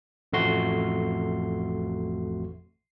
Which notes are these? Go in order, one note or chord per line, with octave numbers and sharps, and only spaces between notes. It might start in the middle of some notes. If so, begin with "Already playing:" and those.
A1 F2 A3 F#4 C6